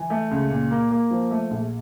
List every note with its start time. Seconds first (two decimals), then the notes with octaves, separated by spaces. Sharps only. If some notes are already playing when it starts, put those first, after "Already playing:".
Already playing: E3
0.10 A3
0.31 C#2
0.50 A#2
0.71 A#3
0.90 A#3
1.11 F3
1.31 A3
1.51 A#1